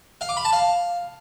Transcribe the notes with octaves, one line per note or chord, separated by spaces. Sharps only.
F5
D6
B5
A5
F5